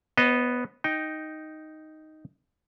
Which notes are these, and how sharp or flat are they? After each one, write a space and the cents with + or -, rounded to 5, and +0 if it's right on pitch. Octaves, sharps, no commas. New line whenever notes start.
B3 +0 C5 +45 D#5 -5
D#4 +0 G5 +0